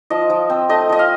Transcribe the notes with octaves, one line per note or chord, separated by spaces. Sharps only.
F3 D#5
F3
C4
A3 D#5
F3 D#5
F5